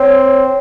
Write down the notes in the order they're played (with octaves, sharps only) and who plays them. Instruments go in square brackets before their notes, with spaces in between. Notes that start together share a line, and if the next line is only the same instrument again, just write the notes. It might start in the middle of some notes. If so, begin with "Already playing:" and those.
Already playing: [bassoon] C4 [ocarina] C#5